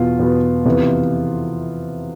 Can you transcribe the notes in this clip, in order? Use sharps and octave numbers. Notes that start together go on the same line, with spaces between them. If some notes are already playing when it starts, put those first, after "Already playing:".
Already playing: E2 B2 B3 F4
E2 B2 B3
F2 C3 E3 B3